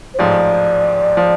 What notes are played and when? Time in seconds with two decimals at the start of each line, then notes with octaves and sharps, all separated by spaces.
0.14 C5
0.19 A1 G#2 F3 D5
1.17 F3